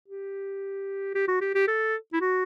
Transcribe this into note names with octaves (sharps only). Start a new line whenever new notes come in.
G4
G4
F#4
G4
G4
A4
E4
F#4